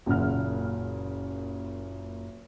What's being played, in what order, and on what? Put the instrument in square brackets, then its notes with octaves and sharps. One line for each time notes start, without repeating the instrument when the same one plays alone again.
[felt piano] F#1 A#2 C#3 F#5 F6